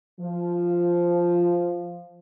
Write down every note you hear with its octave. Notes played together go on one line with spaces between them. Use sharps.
F3